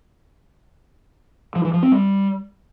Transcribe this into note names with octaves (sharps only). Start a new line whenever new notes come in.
F3
E3
F3
C4
G3